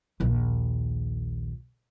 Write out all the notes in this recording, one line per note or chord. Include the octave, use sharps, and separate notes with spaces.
A#1 D#2